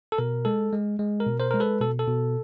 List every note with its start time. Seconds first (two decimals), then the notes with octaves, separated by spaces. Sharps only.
0.12 A4
0.18 B2 A#4
0.45 G#3 A4
0.72 G#3
0.99 G#3
1.20 A#4
1.26 B2
1.40 A#4 C5
1.51 G#3 A#4
1.60 A4 B4
1.81 B2 A4
1.99 A4
2.08 B2